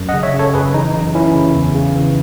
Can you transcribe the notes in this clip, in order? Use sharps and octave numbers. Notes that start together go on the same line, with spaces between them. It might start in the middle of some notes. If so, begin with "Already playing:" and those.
Already playing: F#2
D#5 F#5
C#3
C#5 E5
C#3
A4 C#5
F#2 G#4 B4
E3 D#4
F#2 D#4
E3 C#4 E4
C#3
E2
C#3
E3